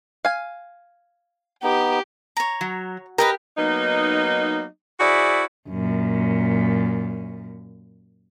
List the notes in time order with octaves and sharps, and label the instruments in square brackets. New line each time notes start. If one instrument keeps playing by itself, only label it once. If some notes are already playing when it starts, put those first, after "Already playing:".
[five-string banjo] F5 G#5
[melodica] B3 D#4 [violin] G4
[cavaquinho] C#5 A#5
[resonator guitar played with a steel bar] F#3
[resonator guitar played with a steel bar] G4 A#4 [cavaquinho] B4 D#5 A#5
[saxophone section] F#3 A#3 B3 D#4
E4 F#4 G#4 C5 D5 E5
[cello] F#2 A#2